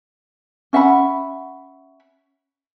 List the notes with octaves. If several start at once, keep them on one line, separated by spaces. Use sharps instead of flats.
C#4 E5 F#5 B5